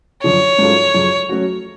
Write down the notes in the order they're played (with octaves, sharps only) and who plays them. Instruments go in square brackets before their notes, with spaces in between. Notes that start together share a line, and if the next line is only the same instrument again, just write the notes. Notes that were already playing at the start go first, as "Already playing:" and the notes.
[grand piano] F#2 D3 F3 [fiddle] C#5
[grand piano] G#2 F#3 C#4 F4 A4
F#2 C#3 F3
F#3 A3 C#4 F#4